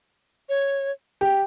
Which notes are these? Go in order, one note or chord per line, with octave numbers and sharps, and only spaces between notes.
C#5
G4